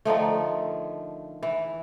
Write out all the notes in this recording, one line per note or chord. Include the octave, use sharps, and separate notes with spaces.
D3 D#3 F3 A3
E3